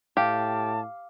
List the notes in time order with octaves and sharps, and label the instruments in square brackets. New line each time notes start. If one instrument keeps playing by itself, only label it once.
[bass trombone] A2 [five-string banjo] G4 [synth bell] F5 D6 F6 [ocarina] A5